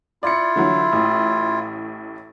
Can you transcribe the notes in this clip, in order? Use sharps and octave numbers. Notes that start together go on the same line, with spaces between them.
E4 F4 D5 C#7
D3 E3 F#3
A1 A2